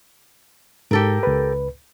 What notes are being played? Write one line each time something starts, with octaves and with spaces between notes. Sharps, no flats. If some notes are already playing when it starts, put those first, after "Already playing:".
G#2 G4 A4 A#4
C#2 B4